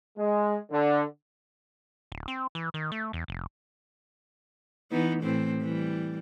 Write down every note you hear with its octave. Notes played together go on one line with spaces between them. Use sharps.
G#3
D3
D1
C4
E3
D#3
A3
E2
F1
E3 B3 D#4
A2 E3 C4
E3 G3